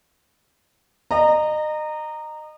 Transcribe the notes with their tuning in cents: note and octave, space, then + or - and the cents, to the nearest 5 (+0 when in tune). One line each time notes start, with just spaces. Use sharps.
D#5 -30 A#5 -10